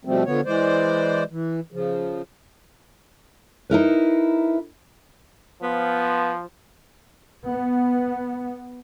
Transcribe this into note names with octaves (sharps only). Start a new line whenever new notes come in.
B2 F3 G3 A3 C4
D3 F3 B3 C#5
E3 G#3 C5 D5
E3
C#3 F3
D#4 E4 A#4 B4
F3 B3
B3